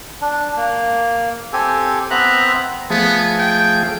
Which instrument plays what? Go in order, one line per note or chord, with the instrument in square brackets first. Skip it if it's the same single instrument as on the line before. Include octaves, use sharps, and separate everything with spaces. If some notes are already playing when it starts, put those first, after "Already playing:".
[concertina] D4
A#3
C4 G4 A4 G#5
B3 C4 E5 A#5 F#6
[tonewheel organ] F3 A3 G#4 [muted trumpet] B3
[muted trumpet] G5